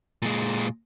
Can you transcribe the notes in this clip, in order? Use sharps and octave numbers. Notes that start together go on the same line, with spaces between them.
A#2 G#3